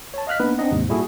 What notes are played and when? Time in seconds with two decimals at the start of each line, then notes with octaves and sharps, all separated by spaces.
0.14 C#5 A5
0.27 D#5 F5 F6 F#6 B6
0.40 A#3 B3 D4 D#4 B4
0.58 C4 D4 D#4 D#5 F#5
0.71 D#2 G#2 C3
0.89 A#2 G3 E4 F#4 G#4 A4